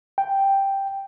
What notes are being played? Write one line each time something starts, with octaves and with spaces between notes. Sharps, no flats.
G5